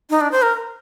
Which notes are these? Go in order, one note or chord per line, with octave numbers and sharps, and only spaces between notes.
D#4
D4
C5
A#4